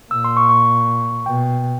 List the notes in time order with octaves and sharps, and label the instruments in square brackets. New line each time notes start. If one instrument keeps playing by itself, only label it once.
[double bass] A#2 [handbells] E6
[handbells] C6
C#6
C#6
[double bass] B2 [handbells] G5